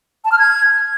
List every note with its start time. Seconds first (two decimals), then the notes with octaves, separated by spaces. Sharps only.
0.25 A5
0.32 F6
0.39 G#6